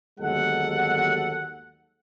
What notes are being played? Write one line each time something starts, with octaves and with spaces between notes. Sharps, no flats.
G1 D#2 F#3 G#3 A4 F#5